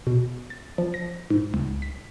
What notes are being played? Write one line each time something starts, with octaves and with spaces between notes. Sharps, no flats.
B2
A6
F3
A#6
G#2
C#2
B6